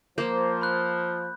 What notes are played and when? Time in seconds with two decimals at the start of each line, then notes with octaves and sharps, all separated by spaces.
0.18 F3 A#3 C5 G6
0.61 B5 F#6